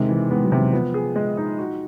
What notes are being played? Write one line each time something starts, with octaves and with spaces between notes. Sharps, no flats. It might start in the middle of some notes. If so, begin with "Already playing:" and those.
Already playing: C3 D#3 G#3
E3
G#3 B3
F#3
C3
F#3
F3 B3
G#4
G#3
D#4
F#4